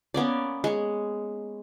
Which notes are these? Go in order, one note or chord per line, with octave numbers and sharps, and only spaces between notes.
A#3 B3 C#4 D5
G#3 C#5